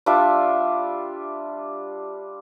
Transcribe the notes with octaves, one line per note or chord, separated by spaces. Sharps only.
G3 D4 F4 E5